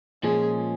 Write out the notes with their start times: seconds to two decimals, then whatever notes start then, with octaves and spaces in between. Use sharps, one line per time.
0.23 A#2 F3 G#3 C#4 G#4